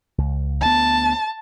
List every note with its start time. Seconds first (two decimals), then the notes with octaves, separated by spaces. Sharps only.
0.18 C#2
0.61 D2 B3 A5